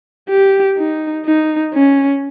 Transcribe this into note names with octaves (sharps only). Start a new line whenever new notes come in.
G4
D#4
D#4
C#4